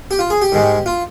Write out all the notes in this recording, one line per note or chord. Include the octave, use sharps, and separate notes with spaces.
G4
F4
G#4
G4
G#2 D#3 G#3
F4